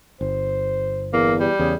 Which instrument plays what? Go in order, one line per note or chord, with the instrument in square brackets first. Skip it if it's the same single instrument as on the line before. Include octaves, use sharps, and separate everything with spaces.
[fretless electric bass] G1 [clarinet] C5
[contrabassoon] E2 [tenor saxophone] A#3
[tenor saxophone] G3
[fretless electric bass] E2 [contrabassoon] C#3 [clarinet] G#4